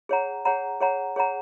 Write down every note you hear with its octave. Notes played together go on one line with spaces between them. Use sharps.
G#4 C#5 F#5 A#5
G#4 C#5 F#5 A#5
G#4 C#5 F#5 A#5
G#4 C#5 F#5 A#5